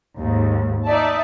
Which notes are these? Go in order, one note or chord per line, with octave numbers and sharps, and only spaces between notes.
D#2 G#2
D#4 D5 E5 A5